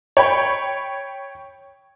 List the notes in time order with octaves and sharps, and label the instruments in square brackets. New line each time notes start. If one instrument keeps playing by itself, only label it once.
[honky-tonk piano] C#5 G5 B5